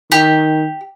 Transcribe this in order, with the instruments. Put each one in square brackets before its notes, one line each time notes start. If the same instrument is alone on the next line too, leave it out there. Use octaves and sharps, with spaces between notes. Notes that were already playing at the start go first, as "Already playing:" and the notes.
[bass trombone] D#3 [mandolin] G4